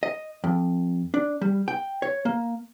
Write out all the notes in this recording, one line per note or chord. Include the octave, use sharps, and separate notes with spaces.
D#5
F2
D4
G3
G5
C#5
A#3